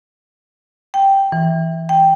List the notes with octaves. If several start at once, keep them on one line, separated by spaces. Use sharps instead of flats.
G5
E3
G5